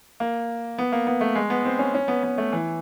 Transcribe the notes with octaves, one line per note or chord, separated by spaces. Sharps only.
A#3
B3
A#3
B3
A3
G#3
B3
C4
C#4
C#4
B3
B3
A3
E3